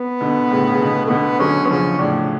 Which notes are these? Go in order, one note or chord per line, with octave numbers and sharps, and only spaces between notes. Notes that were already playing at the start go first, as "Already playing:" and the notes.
Already playing: B3
B2 D3
A2 C#3
C#3
B2 D3
A3
B2 D3 B3
D3 F#3 C#4
B3
C#3 F3 C#4
A2 C#3 D4